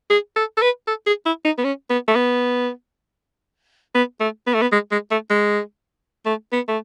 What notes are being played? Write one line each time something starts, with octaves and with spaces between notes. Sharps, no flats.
G#4
A4
A4
B4
A4
G#4
E4
D#4
B3
C#4
B3
A3
B3
B3
A3
B3
A3
B3
G#3
G#3
A3
G#3
A3
B3
A3